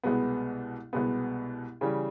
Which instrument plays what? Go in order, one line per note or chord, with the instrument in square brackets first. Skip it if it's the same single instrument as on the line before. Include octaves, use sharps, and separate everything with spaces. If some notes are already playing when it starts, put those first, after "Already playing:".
[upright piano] C2 B2 G#3 B3
C2 B2 G#3 B3
C#3 E3 G3